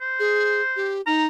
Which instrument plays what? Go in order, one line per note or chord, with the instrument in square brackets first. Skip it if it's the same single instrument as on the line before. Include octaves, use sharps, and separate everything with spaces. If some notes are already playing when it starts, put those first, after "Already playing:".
[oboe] C5
[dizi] G#4
G4
[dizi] D#4 [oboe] A#5